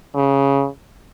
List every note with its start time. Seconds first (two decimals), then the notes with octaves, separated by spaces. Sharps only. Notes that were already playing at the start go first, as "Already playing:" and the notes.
0.15 C#3